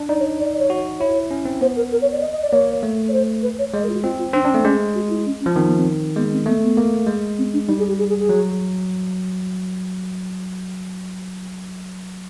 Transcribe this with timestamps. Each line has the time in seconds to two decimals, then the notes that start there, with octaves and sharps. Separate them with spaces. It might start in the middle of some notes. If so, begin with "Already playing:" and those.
Already playing: D4
0.09 D#4 D5
0.20 C#5
0.40 D5
0.54 D5
0.59 C#5
0.70 F#4
1.00 E4 C#5
1.31 C#4
1.45 C4
1.61 B3 C5
1.76 A#4
1.92 A#4
2.02 C#5
2.12 D5
2.21 D#5
2.32 D#5
2.42 D5
2.52 A#3 C#5
2.83 A3
3.08 C#5
3.13 C5
3.42 B4
3.59 C#5
3.74 G#3 D#5
3.83 A#4
3.89 F4
3.94 F#4
4.03 C4 F4
4.18 F4
4.34 C4 D4
4.45 C#4 D4
4.54 A3 C4
4.64 G#3 C#4
4.95 F#4
5.09 E4
5.26 C#4
5.40 C#4
5.46 F3
5.55 D#3 C4
5.66 B3
5.76 C4
6.16 G#3 B3
6.32 C4
6.46 A3 B3
6.62 B3
6.77 A#3
7.07 G#3
7.38 C4
7.53 D4
7.67 G3 D#4
7.78 G#4
7.88 G4
7.98 G#4
8.09 G#4
8.19 G#4
8.29 F#3